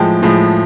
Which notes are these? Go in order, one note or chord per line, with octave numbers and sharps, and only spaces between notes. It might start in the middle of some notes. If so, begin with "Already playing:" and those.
Already playing: A2 F3 G#3 G5 A5
A2 F3 G#3